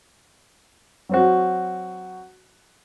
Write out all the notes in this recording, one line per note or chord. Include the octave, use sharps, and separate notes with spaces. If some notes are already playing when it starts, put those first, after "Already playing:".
F#3 C4 F#4